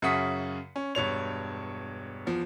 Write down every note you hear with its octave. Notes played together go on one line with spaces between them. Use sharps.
F#2 C#3 E5 F#5 D#6 B6
C#4
E1 G2 C#5 F7
E2 F3